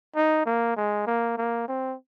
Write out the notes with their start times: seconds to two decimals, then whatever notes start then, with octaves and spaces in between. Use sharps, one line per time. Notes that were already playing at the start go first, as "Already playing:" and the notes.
0.16 D#4
0.46 A#3
0.77 G#3
1.07 A#3
1.38 A#3
1.68 C4